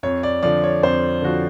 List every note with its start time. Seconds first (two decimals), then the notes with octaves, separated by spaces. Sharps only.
0.03 F2 C#5
0.23 D5
0.43 D3 F3 D5
0.64 C#5
0.83 F2 C5
1.22 D3 F3 F#4